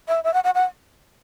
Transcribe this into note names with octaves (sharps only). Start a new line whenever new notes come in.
E5
E5
F#5
F#5
F#5